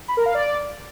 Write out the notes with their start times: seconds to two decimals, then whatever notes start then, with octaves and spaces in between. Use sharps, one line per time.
0.08 B5
0.17 A#4
0.26 F5
0.35 D5